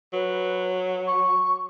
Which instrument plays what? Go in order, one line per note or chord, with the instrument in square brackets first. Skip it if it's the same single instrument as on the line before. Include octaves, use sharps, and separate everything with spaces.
[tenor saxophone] F#3 [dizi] B4
[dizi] C#6